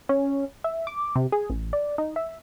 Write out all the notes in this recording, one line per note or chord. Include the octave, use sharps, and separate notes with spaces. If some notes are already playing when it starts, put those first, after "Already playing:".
C#4
E5
D6
C3
G#4
A1
D5
D#4
E5